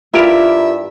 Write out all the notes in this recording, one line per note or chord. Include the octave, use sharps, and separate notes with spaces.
G2 E4 F4 G4 A#4 E5